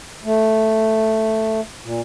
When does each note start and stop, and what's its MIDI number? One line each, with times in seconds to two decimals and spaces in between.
0.25 1.61 57
1.84 2.01 46